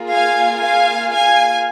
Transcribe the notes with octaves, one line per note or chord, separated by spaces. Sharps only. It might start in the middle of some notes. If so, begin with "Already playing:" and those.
Already playing: A#3 F4 G#4
F5 G#5
F5 G#5
F5 G#5